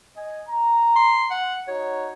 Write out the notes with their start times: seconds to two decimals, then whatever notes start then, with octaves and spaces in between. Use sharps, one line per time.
0.17 D#5 G#5
0.49 A#5
0.96 C6
1.31 F#5
1.68 D#4 F#4 C#5